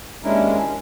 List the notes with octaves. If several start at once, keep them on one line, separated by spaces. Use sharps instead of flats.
D#2 G#3 C#4 D4 E4 A#4